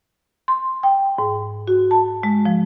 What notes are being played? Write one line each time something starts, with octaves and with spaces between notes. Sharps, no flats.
C6
G5
G#2
F#4
A5
G#3
F3